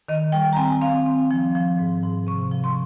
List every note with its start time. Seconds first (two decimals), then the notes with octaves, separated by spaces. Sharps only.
0.08 D#3 D#5
0.32 G3 G5
0.53 A#5
0.57 C4 G#5
0.82 C4 F5
1.06 C4
1.31 F3
1.55 F3
1.79 G#2
2.03 G#2
2.27 C3 C#6
2.51 F3
2.64 C6